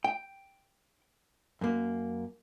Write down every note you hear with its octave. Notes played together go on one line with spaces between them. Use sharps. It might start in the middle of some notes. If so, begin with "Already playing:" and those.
G5
F#2 A#3